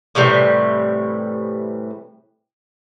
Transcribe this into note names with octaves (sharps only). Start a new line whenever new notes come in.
A2 C3 E3 G3